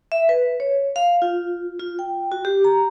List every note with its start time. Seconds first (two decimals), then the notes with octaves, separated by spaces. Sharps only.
0.12 E5
0.29 B4
0.60 C#5
0.96 F5
1.22 F4
1.80 F4
1.99 G5
2.32 F#4
2.45 G4
2.64 A#5